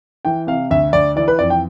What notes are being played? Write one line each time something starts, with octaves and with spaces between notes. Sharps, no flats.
E3 G5
C3 F5
D2 E5
D2 D5
E3 D5
B4
F2 D5
G5